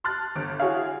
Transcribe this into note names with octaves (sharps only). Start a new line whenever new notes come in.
A5 C6 F6 F#6 A6
G1
E4 F#4 G#4 C#5 F5